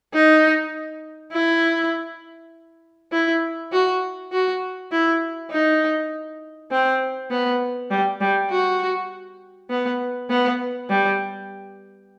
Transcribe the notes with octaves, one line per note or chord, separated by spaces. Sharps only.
D#4
E4
E4
F#4
F#4
E4
D#4
C4
B3
G3
G3
F#4
B3
B3
G3